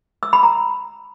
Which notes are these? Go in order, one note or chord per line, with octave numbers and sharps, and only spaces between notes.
E6
B5
A#5